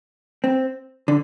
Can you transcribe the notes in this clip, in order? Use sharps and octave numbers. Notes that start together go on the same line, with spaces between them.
C4
D3